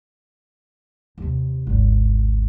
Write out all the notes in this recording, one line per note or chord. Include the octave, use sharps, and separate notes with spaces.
D#2 C3
G#1 D2